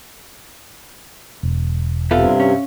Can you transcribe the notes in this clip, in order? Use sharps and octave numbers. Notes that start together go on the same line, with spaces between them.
E1
G2 C3 B3 F4 A4 E5 F5
C#4